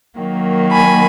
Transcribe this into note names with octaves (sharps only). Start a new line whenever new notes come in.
D#3 F#3 A#3
G#5 B5